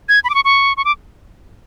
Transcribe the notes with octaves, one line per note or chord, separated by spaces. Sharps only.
G#6
B5
D6
C#6
C#6
C#6
D6